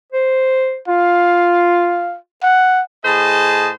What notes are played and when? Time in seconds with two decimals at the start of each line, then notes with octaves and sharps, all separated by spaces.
0.12 C5
0.88 F4 F5
2.43 F#5
3.05 A2 G#4 C5 D#5 A5